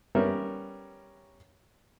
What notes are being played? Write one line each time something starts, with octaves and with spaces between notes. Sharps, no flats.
G3 B3 C#4 A#4 E5